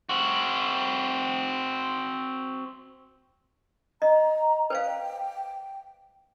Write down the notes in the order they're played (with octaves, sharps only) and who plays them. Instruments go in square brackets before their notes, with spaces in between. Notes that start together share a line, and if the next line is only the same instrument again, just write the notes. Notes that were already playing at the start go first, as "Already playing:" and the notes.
[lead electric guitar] C4 F#4
[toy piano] D#5 [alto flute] A#5
[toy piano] B4 C5 F5 [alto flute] G5